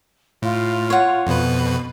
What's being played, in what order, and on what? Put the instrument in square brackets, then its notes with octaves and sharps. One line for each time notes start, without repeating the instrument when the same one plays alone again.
[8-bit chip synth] A2 [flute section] F4
[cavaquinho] C#5 F#5
[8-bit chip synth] F2 B2 B4